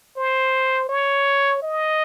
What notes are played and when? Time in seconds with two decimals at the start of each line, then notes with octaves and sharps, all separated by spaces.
0.16 C5
0.89 C#5
1.62 D#5